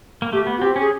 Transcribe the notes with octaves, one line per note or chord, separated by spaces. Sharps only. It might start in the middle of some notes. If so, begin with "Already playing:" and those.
A#3
A3 G4
B3
F#4
C4 G4
C#4
G#4